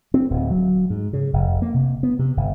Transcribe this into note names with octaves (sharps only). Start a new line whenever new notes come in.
C4
D1
F#3
G#2
C#3
F1
A#3
C3
B3
C3
G1